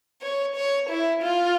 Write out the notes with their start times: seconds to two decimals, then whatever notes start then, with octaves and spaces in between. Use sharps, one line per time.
0.22 C#5
0.56 C#5
0.89 E4
1.22 F4